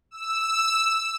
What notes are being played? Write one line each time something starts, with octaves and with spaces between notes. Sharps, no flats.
E6